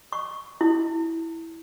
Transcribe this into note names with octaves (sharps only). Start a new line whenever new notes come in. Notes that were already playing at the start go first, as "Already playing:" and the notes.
C#6
E4